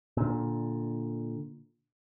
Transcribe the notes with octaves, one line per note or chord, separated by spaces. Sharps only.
A#2 D3